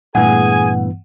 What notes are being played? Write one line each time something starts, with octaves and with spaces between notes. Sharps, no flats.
G2 A#2 E3 A3 B3 G#4 F#5 G#5